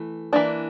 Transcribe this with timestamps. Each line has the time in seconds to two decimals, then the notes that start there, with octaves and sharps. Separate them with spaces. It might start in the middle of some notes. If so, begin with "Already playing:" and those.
Already playing: E3 A3
0.33 E3 A#3 D4